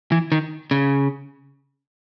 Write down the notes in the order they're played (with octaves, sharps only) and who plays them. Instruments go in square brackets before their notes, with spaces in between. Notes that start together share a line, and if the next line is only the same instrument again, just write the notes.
[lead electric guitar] E3
D#3
C#3